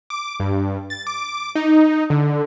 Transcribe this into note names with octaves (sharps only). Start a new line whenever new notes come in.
D6
G2
A6
D6
D#4
D3